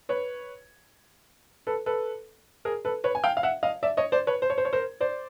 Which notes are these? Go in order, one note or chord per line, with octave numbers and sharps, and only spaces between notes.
B4 C#5
A4 B4
A4 B4
G#4 A#4
A4 B4
B4 C#5
G#5
F5 G5
F5
E5 F#5
D#5 F5
D5 E5
C#5 D#5
C5 D5
B4 C#5
C5
C#5
C5
C#5
A#4 C5
C5 D5